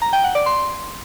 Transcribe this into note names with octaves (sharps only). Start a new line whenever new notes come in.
A#5
G5
F#5
D5
C6